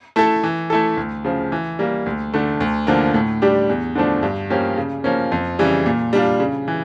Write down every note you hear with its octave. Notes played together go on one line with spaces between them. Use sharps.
A3 E4 A4
E3
A3 E4 A4
D2
C#3 F3
E3
G3 A#3
D2
D3 A3
D2
D3 F3 A#3
A2
G3 D4 G4
E2
D3 F3 A3 D4
G2
F3 A#3 C#4 G4
C#3
F3 A#3 C#4
F2
C#3 E3 G3
A#2
G3 D4 F4
C#3
E3